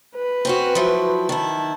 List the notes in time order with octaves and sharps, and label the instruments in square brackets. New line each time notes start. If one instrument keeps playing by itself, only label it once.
[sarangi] B4
[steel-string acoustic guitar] C4 C#4 F#4
F3 F#3 E4
[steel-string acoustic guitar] D#3 E4 [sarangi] A5